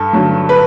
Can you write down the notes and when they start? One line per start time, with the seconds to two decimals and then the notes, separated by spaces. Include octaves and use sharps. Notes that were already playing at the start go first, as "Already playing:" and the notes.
Already playing: G2 A4
0.13 D3 F#3
0.49 B4